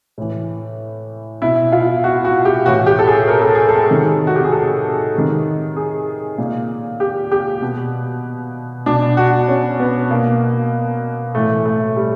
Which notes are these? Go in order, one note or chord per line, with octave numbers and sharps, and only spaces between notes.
A2 E3
B2 E4
F4
F#4
F#4
G4
A2 E3 F#4
G4
A4
G#4
A#4
A4
G#4
A4
C3 D#3
F#4
G4
G#4
A4
C3 D#3
G#4
A#2
G4
G4
B2
B2 D4
F#4
C#4
B3
B2 A#3
A2 E3 A3
A3
G3